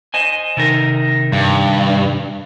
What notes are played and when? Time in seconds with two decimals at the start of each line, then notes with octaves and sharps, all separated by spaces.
0.14 C5 D#5 G#5
0.57 C3 D#3 A#4
1.32 G2